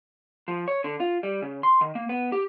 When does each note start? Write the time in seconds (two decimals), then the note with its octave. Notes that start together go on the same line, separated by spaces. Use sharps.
0.48 F3
0.68 C#5
0.84 D3
1.00 F4
1.23 G3
1.42 C#3
1.63 C6
1.81 D#3
1.95 A#3
2.09 B3
2.32 G4